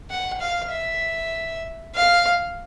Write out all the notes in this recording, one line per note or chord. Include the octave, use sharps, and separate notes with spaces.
F#5
F5
E5
F5